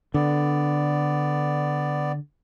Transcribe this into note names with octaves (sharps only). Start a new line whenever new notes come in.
D3 B3 D5